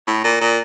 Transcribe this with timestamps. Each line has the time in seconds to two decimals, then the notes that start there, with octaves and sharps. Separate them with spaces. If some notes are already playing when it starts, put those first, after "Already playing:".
0.07 A2
0.24 A#2
0.41 A#2